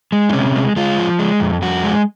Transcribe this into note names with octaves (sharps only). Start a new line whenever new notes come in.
G#3
D#4
C3 C#4
G#3
G#3 F4
F3
G#3
F2
F2 F#4
G#3